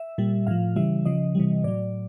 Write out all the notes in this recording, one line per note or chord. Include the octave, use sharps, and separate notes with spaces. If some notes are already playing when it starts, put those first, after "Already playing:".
Already playing: E5
A#2 G3
A2 F3 F5
C#3 E3 G3 E5
C#3 F3 D#5
C3 E3 G3
A2 F#3 D5